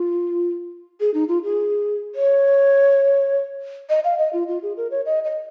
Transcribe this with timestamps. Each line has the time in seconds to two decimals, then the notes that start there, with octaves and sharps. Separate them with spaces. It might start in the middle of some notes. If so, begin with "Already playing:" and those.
Already playing: F4
1.00 G#4
1.14 D#4
1.28 F4
1.44 G#4
2.15 C#5
3.90 D#5
4.04 F5
4.19 D#5
4.33 F4
4.48 F4
4.63 G#4
4.77 A#4
4.91 C#5
5.06 D#5
5.24 D#5